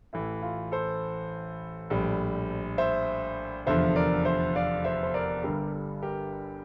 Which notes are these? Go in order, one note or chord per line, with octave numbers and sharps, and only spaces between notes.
A1 A2 E3 E4
F4
A4 C5
A#1 A2 G3
C5 E5
F1 E2 D3 F3 C5 E5
A#4 D5
C5 E5
D5 F5
C5 E5
C5
A#4 D5
G1 G2 D3 G3 G4 A#4
G4 A#4